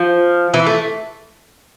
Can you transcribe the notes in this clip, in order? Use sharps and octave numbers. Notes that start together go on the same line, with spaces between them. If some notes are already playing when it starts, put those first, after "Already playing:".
Already playing: F3
E3
A3